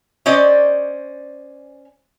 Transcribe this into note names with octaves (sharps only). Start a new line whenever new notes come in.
C#4 C5 D5 D#5